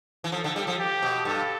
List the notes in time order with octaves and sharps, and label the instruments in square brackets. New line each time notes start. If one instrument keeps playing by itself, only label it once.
[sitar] E3
[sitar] F3 [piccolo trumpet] A4
[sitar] D3
G3
F3
[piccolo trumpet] G4
[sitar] B2
[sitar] G2 [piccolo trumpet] A4